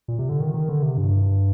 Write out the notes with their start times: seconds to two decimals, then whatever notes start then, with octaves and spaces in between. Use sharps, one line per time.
0.08 A#2
0.19 C3
0.29 D3
0.40 D#3
0.54 D#3
0.69 D3
0.83 C3
0.97 G2